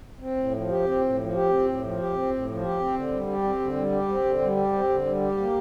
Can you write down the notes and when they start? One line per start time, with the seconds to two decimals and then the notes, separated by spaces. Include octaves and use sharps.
0.20 C4
0.36 A2
0.53 F3
0.69 G4
0.85 C4
1.01 A2
1.17 F3
1.33 G4
1.49 C4
1.66 A2
1.82 F3
1.98 G4
2.14 C4
2.31 A2
2.47 F3
2.63 G4
2.79 C4
2.95 D3
3.11 G3
3.27 G4
3.43 C4
3.60 D3
3.76 G3
3.92 G4
4.08 C4
4.25 D3
4.41 G3
4.57 G4
4.72 C4
4.89 D3
5.05 G3
5.21 G4
5.37 A#3